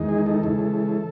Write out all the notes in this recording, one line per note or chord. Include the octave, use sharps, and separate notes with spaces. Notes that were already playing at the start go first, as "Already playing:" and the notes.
Already playing: E2 D#3 G#3 D#4
G#4
A4
C#3 E3 G#3